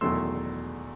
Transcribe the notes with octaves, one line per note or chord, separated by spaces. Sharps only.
E1 E2 D#3 F#3 A3 C6 E6